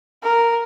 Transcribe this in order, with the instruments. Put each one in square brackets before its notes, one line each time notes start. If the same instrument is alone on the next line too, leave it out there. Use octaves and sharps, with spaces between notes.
[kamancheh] A#4